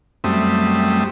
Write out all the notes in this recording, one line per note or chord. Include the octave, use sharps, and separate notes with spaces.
F#2 G3 A3 C4 E5 D#6